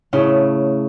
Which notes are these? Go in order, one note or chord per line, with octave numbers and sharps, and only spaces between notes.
A2 C#3 A3